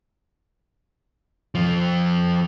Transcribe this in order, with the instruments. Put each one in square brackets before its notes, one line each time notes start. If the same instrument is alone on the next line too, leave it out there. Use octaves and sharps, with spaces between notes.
[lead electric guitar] F2 F3